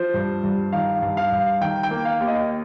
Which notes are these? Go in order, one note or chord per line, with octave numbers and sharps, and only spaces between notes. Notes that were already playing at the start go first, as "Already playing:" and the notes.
Already playing: F3 C5
G2
G2
D#3 F5
G2
F5
G2
D#3 G5
G5
A#3
F5
D#2
D#5